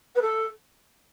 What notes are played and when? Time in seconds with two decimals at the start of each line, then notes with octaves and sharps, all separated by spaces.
0.15 B4
0.21 A4